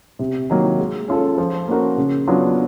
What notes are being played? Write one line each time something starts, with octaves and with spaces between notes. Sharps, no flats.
C3
D#3 F#3 A#3
G#3
C#4 F4 A4
F3
A#3 C#4 F#4 A#4
C#3
F#3 B3 D4 F4